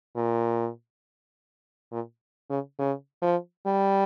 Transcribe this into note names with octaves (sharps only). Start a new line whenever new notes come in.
A#2
A#2
C#3
C#3
F3
G3